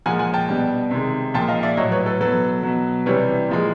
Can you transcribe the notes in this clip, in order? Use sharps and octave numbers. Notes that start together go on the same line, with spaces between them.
A#2 F3 G#3 F#5 G#5
F#5 G#5
G5 A5
B2 G3
C3 D#3 G#3
A#2 F3 G#3 G5 A5
D#5 F5
D5 E5
A2 F#3 C#5 D#5
B4 C#5
A4 B4
B2 F#3 A4 B4
B2 F#3
C3 E3 G3 B4 C#5
A#2 F3 G#3